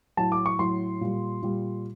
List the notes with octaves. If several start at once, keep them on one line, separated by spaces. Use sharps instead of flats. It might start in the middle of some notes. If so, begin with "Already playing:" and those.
A2 F#3 A5
D6
C#6
A2 F#3 C6
A#2 G3
A#2 G3